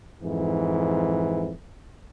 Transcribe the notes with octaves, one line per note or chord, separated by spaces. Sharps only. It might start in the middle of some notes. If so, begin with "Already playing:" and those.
F2 G#2 E3